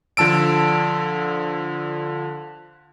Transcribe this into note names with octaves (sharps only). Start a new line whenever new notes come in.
D3 F3 A5 E6 D7